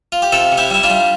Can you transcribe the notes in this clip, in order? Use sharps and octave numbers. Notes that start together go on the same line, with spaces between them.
F4
G4
C3 F4 A4
C3
E4 G4
G3 E4
D4 F4
G3